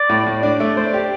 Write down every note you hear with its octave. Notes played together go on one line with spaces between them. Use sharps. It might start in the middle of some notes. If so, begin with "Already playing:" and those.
Already playing: D5
A2
A2
D4
A3
C5
G4